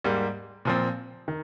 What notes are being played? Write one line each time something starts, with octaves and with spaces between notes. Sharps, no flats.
G#2 G3 A#3
A#2 F3 C4
D#3